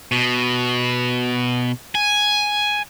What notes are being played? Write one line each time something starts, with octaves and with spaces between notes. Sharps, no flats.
B2
G#5